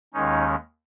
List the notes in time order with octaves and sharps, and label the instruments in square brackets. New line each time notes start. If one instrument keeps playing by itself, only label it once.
[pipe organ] D#2 D#3 G#3 C#4 D#4